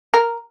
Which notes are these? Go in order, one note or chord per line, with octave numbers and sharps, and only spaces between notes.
A#4